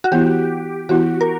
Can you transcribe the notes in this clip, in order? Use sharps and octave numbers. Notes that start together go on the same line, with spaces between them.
F#4
E3 B3 E4 G4
E3 B3 E4 F#4
A#4